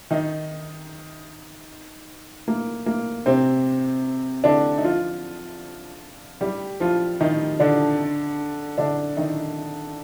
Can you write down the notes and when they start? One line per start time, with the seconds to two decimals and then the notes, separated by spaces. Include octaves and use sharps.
0.10 D#3 D#4
2.48 A#3
2.86 A#3
3.26 C3 C4
4.44 D3 D4
4.78 D#4
4.84 F3 F4
6.41 G3 G4
6.80 F3 F4
7.21 D#3 D#4
7.60 D3 D4
8.78 D3 D4
9.17 D#3 D#4